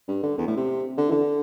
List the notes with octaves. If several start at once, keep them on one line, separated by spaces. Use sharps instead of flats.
G2
D3
E2
A2
C3
D3
E3
D3